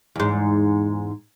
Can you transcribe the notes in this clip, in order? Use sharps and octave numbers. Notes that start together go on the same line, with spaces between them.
E2 G#2